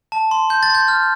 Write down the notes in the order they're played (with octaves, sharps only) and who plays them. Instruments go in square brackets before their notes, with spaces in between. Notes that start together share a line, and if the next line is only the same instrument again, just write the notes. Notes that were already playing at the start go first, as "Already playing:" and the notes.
[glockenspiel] A5
C6
C6 G6
A6
C6 G6
F6